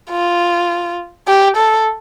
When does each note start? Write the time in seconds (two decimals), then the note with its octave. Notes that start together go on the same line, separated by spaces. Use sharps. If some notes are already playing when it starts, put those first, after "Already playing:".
0.11 F4
1.27 G4
1.57 A4